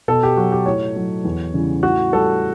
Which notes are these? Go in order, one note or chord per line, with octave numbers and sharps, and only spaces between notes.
B2 A4
G4
F#3 F#4
G4
A2 C#5
F#3
E2
C#3 E3 G3
A2 F#4
G3 A4